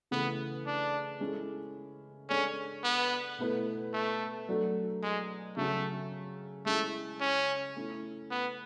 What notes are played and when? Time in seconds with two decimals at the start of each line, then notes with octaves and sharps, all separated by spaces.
0.11 C#3 E3 A3 B3 E4 B4
0.66 D4
1.21 G#3 C#4 E4 A4
2.29 G#3 C#4 D4 A4
2.84 B3
3.38 B2 A3 E4 B4
3.94 A3
4.49 F#3 A3 D4 A4
5.03 G#3
5.57 C#3 F#3 A3 C#4
6.66 G#3 A3 C#4 E4
7.20 C#4
7.76 A3 C#4 E4
8.31 B3